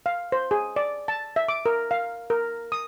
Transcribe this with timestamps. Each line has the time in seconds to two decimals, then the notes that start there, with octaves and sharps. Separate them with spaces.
0.06 F5
0.32 C5
0.51 G#4
0.76 D5
1.08 A5
1.36 E5
1.48 D6
1.66 A#4
1.91 F5
2.30 A#4
2.72 D#6